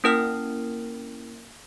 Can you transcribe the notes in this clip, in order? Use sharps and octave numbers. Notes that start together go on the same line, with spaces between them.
A#3 C#4 E4 A#4 G5 F6